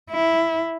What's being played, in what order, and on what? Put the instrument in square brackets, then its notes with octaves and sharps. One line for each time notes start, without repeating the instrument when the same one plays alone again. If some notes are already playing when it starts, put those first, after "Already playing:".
[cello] E4